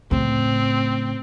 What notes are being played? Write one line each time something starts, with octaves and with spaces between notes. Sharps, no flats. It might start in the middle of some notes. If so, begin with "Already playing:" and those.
A2 C#3 C4